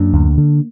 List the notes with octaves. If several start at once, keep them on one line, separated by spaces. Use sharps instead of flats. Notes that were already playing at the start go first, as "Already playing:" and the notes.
Already playing: F#2 A#3 D4
D2
D3